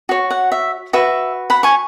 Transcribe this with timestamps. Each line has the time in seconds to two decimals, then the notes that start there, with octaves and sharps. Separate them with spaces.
0.09 F#4 C#5
0.30 F#5
0.52 E5
0.93 F#4 B4 E5
1.50 F#5 B5
1.63 G#5 C#6